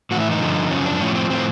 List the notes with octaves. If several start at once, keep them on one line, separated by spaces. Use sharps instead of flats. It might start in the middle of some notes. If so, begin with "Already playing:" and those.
A2 E3 F#4
E4
D#4
G2 D3 F3
F#2 C#3 F3 C#4
D4
A2 F3 C#4
C4
A2 F3 C4